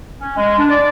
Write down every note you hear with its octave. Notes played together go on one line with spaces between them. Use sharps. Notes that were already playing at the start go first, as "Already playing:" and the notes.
C#4
G#3
D4
D5